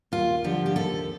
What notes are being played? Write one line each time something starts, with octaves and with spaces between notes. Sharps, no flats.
D#2 F4
D3 F3 G4
G4
D#2 A4